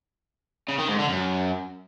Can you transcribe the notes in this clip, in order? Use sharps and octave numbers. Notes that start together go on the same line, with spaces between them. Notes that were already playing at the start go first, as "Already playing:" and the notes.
C#3
D#3
G#2
D3
F#2